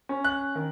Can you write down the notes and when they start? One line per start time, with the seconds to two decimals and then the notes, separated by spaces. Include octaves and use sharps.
0.09 C#4
0.24 F#6
0.55 D#3